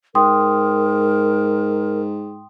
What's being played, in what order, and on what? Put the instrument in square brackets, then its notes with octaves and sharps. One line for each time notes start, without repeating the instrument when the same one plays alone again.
[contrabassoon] G#2 [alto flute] A#4 [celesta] G5 C6 D#6